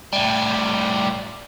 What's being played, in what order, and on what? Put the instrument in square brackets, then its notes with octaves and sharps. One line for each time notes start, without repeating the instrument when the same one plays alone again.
[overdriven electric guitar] A2 G3